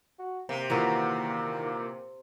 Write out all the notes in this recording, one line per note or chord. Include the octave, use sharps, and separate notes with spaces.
F#4
C3 A#3
A#2 D#3 E3 A#3 F#4 A#4